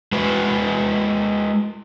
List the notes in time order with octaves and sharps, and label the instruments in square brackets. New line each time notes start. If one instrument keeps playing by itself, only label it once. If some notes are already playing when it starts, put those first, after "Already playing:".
[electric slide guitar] G#3 F#4 B4